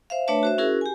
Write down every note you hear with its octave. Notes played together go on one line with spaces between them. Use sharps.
C5 E5 F5
A3 D4 B4 C#5 E5 A5
F#4 C5 E5
C#4 E4 F#4 G#4 A#4
G4 G#5